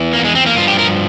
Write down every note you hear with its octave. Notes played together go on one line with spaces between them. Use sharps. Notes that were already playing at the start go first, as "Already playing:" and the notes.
Already playing: E2 E3
A#3
G#3
C4
A#3
G2 F3 F4
G4
A#4